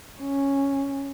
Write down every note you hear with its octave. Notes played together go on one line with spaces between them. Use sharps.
C#4